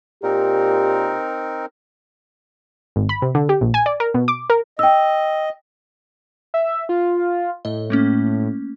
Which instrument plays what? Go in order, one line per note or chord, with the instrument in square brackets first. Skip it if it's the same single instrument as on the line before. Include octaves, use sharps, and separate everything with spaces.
[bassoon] A#2 [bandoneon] C4 D#4 A#4 [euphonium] G4
[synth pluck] G#1
B5
C3
D3
G4
A#1
G#5
D5
A#4
B2
D6
A#4
[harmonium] D#5 [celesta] G5 E6
[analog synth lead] E5
F4
[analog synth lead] A2 [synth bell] D#5
[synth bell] A3 A#3 C#4